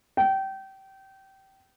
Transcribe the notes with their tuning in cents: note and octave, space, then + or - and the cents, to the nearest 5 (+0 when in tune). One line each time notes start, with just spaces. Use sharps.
G5 -25